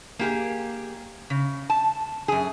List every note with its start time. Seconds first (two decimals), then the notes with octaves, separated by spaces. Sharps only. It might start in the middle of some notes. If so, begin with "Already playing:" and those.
0.19 A#3 G4 G#4
1.30 C#3
1.70 A5
2.28 F#2 G#4